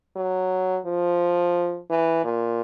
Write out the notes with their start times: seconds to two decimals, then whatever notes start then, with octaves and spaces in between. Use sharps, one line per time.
0.16 F#3
0.86 F3
1.90 E3
2.24 A#2